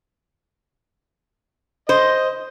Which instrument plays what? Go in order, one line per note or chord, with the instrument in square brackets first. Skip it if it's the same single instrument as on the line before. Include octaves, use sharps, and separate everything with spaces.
[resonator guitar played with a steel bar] C5 [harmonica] D#5